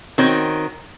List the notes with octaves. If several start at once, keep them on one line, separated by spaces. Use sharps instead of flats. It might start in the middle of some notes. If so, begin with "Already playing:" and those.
D#3 C4 F#4 C#5